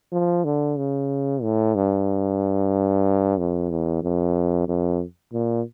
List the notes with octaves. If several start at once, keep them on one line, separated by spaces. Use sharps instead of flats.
F3
D3
C#3
A2
G2
F2
E2
F2
F2
A#2